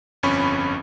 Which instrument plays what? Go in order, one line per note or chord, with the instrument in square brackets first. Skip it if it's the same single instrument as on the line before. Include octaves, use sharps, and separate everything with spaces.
[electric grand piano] G1 F2 C#4 B5 C#6